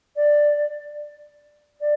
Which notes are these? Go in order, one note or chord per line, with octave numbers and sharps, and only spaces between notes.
D5
D5